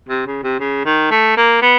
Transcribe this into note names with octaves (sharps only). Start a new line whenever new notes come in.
C3
C#3
C3
C#3
D#3
A3
A#3
B3